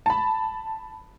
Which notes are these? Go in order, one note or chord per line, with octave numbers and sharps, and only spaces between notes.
A5 B5